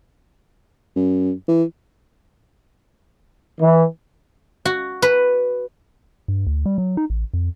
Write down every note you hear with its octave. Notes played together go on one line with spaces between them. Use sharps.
F#2
E3
E3
F#4
B4
G2
D2
G3
F#3
D#4
A1
F2